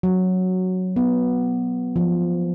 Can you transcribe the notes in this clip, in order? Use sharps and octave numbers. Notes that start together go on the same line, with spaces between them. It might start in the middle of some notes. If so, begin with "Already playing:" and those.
F#3
B3
F3